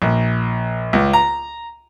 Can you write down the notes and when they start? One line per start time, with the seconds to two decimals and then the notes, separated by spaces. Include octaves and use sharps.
0.02 A#1
0.93 C#2
1.13 A#5